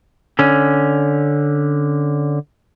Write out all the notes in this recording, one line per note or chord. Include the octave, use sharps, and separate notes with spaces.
D3 C#4